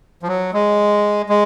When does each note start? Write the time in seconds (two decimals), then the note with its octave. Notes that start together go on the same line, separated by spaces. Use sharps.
0.23 F3
0.28 F#3
0.53 G#3
1.29 G#3